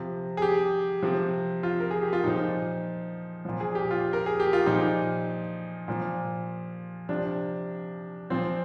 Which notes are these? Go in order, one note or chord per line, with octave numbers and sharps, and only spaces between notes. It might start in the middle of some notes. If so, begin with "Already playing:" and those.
Already playing: C3 F3
G#4
G4
C3 F3
F4
A#4
G#4
G4
F4
A#2 F3 D#4
A#2 F3
G#4
G4
F4
A#4
G#4
G4
F4
A#2 F3 D#4
A#2 F3
C3 F3 D4
A#2 F3 C4